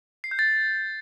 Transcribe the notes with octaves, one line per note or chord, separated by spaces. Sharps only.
C7
G6
A6